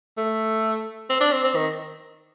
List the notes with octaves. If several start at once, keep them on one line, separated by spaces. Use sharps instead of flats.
A3
C4
D4
C4
C4
D#3